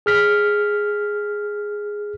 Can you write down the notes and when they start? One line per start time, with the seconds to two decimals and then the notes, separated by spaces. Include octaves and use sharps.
0.06 G#4 F6 B6